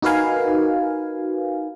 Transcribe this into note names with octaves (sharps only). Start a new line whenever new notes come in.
D#4 F#4 A#4 B4 F5 G#5